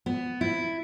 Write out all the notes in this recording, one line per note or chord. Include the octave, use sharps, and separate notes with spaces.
B3
E4